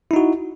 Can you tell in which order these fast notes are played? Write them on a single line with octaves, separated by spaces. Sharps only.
E4 D#4 F#4